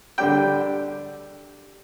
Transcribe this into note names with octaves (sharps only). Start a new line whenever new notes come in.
D3 G3 D4 G5